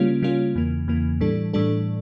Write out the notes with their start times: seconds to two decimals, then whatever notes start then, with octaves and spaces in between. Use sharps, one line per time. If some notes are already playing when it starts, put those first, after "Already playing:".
Already playing: C#3 G3 A#3 C#4 F4
0.22 C#3 G3 A#3 C#4 F4
0.55 E2 C#3 E3 A#3
0.88 E2 C#3 E3 A#3
1.20 A2 E3 G3 D4 A4
1.53 A2 E3 G3 D4 A4